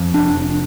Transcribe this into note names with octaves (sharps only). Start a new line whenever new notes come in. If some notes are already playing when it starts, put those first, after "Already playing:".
Already playing: F2
F1 D4
F1